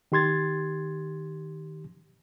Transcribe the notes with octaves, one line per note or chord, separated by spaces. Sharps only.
D#3 G4 C6 G#6 A6